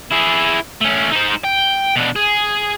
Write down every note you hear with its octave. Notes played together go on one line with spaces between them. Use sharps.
E4 G#4
A3 C#4
D#4 C5
G5
B2 D4
G#4